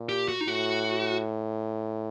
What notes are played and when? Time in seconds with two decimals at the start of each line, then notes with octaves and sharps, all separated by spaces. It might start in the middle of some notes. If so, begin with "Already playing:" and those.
Already playing: A#2
0.09 G4
0.28 F#4
0.41 D#4
0.47 A2 F#4